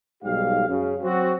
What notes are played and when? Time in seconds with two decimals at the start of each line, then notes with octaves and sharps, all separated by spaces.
0.23 B1 G#2 G3 G4 F5
0.67 F#2 C#3
1.02 F#3 C4 F#4